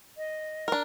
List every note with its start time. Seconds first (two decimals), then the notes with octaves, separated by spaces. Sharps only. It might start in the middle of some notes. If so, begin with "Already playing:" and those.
0.17 D#5
0.68 D4 A#4